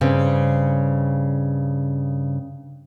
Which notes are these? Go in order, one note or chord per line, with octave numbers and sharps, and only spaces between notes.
G2 C#3 C4